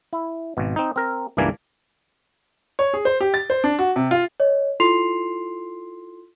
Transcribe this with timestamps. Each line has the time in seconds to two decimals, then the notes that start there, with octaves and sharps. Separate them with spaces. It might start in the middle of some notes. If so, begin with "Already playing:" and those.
0.13 E4
0.57 G#1 B2
0.76 C4 D#4
0.96 C4 A#4
1.37 C#2 G2 E3 A#3 D4 G#5
2.79 C#5
2.94 G#4
3.05 C5
3.21 G4
3.34 A6
3.50 C5
3.64 D4
3.79 F#4
3.96 C3
4.11 F4
4.40 C#5 D#5
4.80 E4 F4 A4 C6 C7 F7